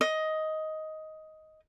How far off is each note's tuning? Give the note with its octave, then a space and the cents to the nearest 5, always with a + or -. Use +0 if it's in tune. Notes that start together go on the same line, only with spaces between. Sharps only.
D#5 +10